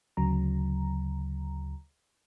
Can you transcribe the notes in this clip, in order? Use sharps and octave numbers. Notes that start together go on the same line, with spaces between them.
D2 C#3 F#3 A#5